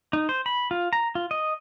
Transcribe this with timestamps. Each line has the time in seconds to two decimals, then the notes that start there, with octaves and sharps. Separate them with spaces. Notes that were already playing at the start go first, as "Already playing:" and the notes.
0.13 D#4
0.29 C5
0.46 B5
0.71 F4
0.93 A#5
1.15 F4
1.31 D#5